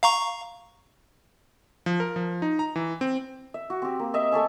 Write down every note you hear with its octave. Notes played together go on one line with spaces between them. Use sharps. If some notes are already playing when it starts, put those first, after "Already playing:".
F5 A#5 C#6
F3
A#4
F3
D#4
A#5
E3
C4
E5
F#4
C4 G4
A#3
D#5 E5
A3 A4 C#5 G#5